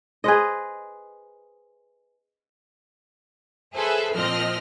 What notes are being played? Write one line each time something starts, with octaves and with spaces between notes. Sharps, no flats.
G#4 B4 C5 D#5
G#4 A4 B4 C5 E5 G#5
A#2 F3 C4 D#5 F6